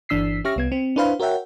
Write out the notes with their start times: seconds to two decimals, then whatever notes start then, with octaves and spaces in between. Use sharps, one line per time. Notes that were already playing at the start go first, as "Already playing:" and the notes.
0.09 G1 E3 D4 E6 B6 C7
0.44 C#4 G4 E5 C#6 F6 A#6
0.56 C2 B3 G#6
0.72 C4
0.96 D4 E4 B4 C5 F5 B5
1.20 F#4 A#4 C#5 E5 F#5 G5